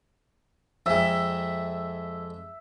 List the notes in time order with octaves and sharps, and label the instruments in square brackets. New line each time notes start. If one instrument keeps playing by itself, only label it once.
[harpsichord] F2 G#3 [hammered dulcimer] E5